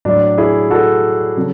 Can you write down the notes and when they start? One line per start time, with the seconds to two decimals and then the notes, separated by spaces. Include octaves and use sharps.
0.05 A2 F#3 D4
0.38 E4 G#4
0.70 F#4 A4
1.37 C#3 F#3